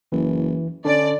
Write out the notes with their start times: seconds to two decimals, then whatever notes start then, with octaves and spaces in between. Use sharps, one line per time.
0.12 F#1 E3
0.85 D3 C#4 D4 D5